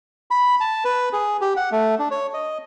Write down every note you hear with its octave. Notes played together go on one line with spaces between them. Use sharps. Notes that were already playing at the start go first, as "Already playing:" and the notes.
B5
A5
B4
G#4
G4
F#5
A3
D4
C#5
D#5